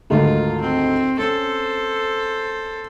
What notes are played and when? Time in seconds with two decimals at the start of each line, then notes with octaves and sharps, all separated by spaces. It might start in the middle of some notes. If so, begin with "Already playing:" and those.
0.10 D2 G#2 D#3 F4
0.60 C4
1.19 C#4 A4 C5